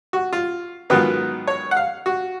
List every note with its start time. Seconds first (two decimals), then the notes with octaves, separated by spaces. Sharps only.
0.13 F#4
0.33 F4
0.90 G#2 D#3 F#3 B3 F4 B4
1.47 C#5
1.71 F#5
1.77 F5
2.06 F#4